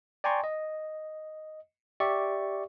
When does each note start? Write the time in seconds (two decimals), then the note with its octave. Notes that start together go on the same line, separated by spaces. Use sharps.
0.24 D5 G5 G#5 A#5 C6 C#6
0.44 D#5
2.00 G4 D5 E5 C#6